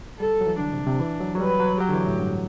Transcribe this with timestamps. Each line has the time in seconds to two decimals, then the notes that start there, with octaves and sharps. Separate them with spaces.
0.19 G3 A4
0.41 F#3
0.47 E3
0.60 D3 D4
0.73 C3
0.87 C3
1.00 E3
1.20 F#3
1.35 F#3
1.40 G3 B4
1.60 F#3
1.80 F#3 G4
1.89 D3
1.93 E3
2.07 A2
2.20 G2